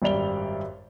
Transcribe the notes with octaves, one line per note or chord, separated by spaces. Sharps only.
G#1 F#2 G3 D5 F7 G7